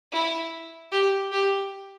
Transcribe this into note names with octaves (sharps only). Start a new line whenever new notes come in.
E4
G4
G4